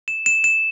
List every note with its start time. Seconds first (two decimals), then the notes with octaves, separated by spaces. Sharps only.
0.08 E7
0.26 E7
0.44 E7